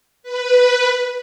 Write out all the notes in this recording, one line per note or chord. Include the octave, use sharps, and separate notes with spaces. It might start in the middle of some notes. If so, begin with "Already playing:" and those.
B4